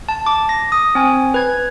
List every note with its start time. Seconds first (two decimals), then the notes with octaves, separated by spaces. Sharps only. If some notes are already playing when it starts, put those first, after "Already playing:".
0.09 A5
0.26 D6
0.49 A#6
0.72 D#6
0.95 C4 G#5
1.34 B4 G#6